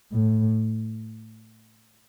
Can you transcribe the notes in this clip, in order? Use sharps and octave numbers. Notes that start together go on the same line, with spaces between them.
A2